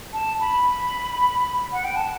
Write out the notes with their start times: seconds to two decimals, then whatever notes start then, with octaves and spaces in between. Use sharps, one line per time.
0.13 A5
0.40 B5
1.72 F#5
1.84 G5
1.96 A5